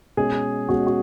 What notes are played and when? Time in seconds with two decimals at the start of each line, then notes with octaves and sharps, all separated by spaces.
0.17 B2 G#3 C#4 G#4
0.69 B2 G#3 C#4 F#4
0.87 F#4